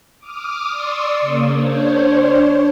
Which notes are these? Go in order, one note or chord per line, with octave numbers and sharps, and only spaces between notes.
D6 D#6 F6
D5 C6 C#6 D#6 E6
C#3 A#3
D4 C5 C#5